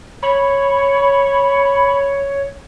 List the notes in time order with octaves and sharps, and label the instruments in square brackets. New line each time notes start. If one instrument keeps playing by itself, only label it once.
[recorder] C#5 [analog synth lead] B5